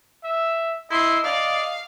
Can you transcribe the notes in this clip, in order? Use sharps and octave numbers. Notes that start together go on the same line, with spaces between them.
E5
E4 D#5 C6
D5 F5